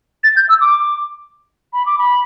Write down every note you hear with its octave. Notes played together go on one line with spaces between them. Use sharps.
A6
G6
E6
D6
B5
D6
B5